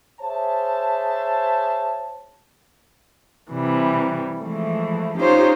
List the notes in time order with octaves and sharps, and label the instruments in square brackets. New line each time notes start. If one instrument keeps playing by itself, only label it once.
[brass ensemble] G#4 C5 C#5 E5 A5
[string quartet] C3 E3 G3
E3 F3 G#3 A3
C#4 D#4 F4 G4 C5 C#5